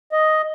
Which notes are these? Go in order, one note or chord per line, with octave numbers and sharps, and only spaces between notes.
D#5